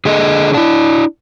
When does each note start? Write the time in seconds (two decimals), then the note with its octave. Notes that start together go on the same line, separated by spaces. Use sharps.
0.05 D3 G#4 A4 D#5
0.54 D4 E4